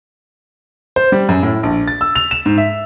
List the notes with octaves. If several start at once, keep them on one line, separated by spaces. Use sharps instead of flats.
C5
G3
F#2
A2
A#1
A6
E6
F7
E7
G#2
E5